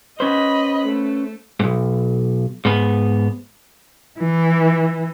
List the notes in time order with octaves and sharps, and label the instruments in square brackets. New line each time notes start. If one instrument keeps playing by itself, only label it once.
[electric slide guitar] C#4 B4 C5 [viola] D#5 B5
[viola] A3
[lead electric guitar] B1 G#2
G#2 B3
[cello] E3